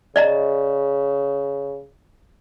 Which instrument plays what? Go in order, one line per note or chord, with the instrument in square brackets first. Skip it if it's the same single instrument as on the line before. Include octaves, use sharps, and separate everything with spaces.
[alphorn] C#3 [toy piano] D5 D#5 A#5